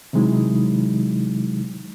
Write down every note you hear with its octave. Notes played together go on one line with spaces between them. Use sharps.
C3 D#3 F#3 G#3 D#4 E4